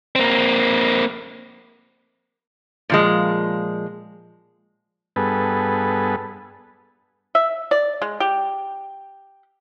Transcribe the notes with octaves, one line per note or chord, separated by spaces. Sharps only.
A#3 C4
A#2 F3 G#3
G2 B3 G#4 A4 B4
E5
D5
G#3
G4